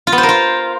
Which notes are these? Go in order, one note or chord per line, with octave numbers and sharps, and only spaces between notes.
F4
B3
C5
A#4
F4